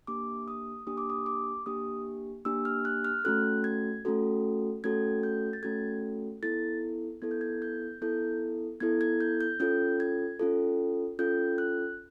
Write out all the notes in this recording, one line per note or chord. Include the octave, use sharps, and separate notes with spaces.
A#3 D4 G4 D6
D#6
A#3 D4 G4 D#6
D6
D#6
D6
A#3 D4 G4 D#6
A#3 D4 G4 E6
F6
F#6
F6
A3 C#4 F#4 A4 F#6
G#6
A3 C#4 F#4 A4
A3 C#4 F#4 A4 G#6
G6
A6
A3 C#4 F#4 A4 G#6
B3 E4 A4 A6
B3 E4 A4 G#6
G6
G#6
G6
B3 E4 A4 G6
B3 E4 A4 G#6
G#6
G6
G6
C#4 F4 A4 G6
G#6
C#4 F4 A4
C#4 F4 A4 G6
F#6